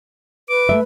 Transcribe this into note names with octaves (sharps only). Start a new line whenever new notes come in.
B4 D6
A3 E5